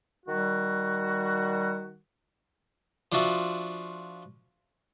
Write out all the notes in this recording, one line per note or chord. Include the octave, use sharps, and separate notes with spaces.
D#3 G3 F#4
F3 D4 F4 F#4 E5